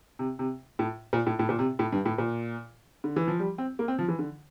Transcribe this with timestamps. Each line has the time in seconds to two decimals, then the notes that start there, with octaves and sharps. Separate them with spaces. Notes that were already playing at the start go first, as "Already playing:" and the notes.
0.19 C3
0.39 C3
0.79 A2
1.13 A#2
1.26 A2
1.39 A2
1.49 A#2
1.59 C3
1.79 A2
1.93 G2
2.05 A2
2.18 A#2
3.04 D3
3.16 E3
3.28 F3
3.39 G3
3.58 C4
3.79 A#3
3.88 C4
3.99 F3
4.08 E3
4.19 D3